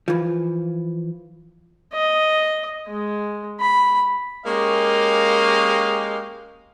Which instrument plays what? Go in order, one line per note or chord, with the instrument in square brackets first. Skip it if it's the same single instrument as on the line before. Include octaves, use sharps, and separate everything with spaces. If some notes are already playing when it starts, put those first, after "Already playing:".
[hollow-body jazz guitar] E3 F3
[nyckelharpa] D#5
G#3
B5
[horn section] G#3 A#3 C#4 G4 D#5 F5